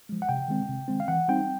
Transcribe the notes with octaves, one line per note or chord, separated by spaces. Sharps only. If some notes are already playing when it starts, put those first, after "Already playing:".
F3 G#3
F#5
C3 G5
D#3 G#3 C4
C3
D#3 G#3 C4
F5
E3 F#5
G3 C4 D#4 G5